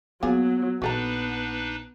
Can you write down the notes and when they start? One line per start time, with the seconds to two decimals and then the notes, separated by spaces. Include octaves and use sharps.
0.23 F#3 A#3 B3 F4 G#4
0.82 A#1 B3 D4 D#4 F#4 A4 B4 A#5